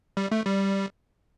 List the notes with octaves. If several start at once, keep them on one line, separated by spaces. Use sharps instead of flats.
G3
A3
G3